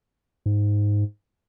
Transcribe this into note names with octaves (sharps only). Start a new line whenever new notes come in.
G#2